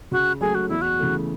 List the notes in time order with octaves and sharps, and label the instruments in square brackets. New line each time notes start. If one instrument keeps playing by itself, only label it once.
[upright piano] C#3 [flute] F#4
[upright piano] F#3 A3 [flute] G#4
[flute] F#4
[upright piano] E2 [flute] E4
[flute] F#4
[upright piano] C#3 E3 A3